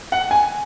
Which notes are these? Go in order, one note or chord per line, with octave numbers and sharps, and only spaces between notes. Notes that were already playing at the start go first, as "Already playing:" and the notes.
F#5
G#5